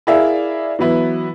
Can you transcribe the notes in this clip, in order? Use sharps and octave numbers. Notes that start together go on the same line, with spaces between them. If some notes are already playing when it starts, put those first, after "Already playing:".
E4 G#4 A#4 D5 E5 F5
E3 F#3 B3 E4